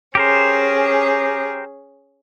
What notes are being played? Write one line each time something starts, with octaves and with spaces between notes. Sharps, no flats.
C#4 G4 G#4 A#4 C5